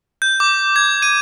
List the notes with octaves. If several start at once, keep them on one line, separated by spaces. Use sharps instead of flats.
G6
D6
G#6
D#7